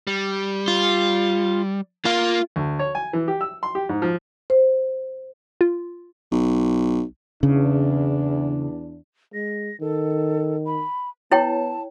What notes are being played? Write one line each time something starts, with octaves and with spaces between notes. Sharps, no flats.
G3
F4
A#3 F4 F5
D2
C#5
G#5
E3
G4
E6
C6
G4
G#2
F3
C5
F4
B1
E2 C#3 D4
G#3 A#6
D#3 A4
B5
B3 E4 C#5 G5 A5